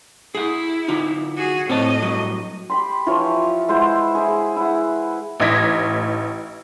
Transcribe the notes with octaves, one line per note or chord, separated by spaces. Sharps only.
E4 G#4 F#5
D3 D#4 F4
F#4 G#4
A2 C4 C#5 D#5 A5
G2 F#3
G4 B5 C6
E3 F3 F4 C#5
G#3 E4 C5 F#5
E4 G#4
G#4
E4 F#5
A1 A2 D#4 G#6 A#6 B6